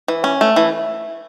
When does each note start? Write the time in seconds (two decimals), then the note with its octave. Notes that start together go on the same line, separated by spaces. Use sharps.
0.08 E3
0.24 C#4
0.41 A3
0.56 E3